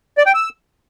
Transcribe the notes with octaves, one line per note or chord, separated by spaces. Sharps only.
D5
G5
E6